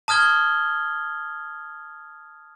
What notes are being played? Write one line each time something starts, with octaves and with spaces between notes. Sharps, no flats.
A5 D#6 F6 G#6 G7